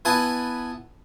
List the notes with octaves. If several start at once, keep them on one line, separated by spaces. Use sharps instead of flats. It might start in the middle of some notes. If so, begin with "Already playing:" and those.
B3 E4 G#5 A5